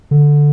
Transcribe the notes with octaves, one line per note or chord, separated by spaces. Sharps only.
D3